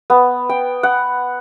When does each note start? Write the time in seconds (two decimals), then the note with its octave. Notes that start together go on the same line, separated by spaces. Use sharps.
0.10 B3
0.49 G5
0.83 F#5